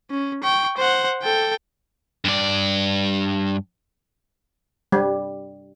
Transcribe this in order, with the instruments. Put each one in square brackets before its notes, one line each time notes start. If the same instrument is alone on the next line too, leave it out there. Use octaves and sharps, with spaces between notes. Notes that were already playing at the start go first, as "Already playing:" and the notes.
[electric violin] C#4
G5 C#6
C5 F#5
A4 G5
[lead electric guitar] G2 D5
[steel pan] G3